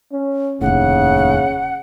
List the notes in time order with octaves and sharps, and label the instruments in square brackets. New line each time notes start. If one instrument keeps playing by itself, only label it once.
[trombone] C#4
[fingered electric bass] F1 D#2 A2 [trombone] C#3 [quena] F#5